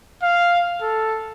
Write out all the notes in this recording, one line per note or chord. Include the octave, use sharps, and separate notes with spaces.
F5
A4